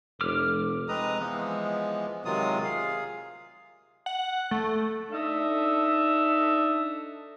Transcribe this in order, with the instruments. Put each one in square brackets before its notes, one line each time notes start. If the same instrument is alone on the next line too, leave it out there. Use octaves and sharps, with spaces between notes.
[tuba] F1 [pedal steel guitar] D6 F6
[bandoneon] G#3 C4 B4 D#5 A#5 D#6
E3 F3 G#3 B3
C3 D#3 F#3 G#3 F4 D#6
G#4 F5
[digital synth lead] F#5
A3
[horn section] D4 D#4 A4 E5